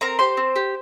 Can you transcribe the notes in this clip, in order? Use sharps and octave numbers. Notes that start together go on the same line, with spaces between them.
C4 A#4 A#5
G4 C5 C6
C4
G4